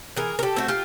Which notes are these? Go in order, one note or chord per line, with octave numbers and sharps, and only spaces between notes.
E3 G#4 A#4
A#4
G4 A4
A3 C4 F#4
F4 G4